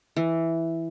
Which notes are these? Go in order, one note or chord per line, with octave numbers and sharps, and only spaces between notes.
E3